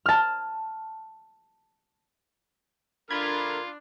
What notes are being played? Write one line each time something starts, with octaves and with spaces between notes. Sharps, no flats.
A5 F6
D3 D4 F4 A#4 B5 F6 G#6